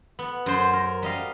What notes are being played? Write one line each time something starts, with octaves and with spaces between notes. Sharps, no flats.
B3
F#2 C5 C6
A#4
G3 D#5 F5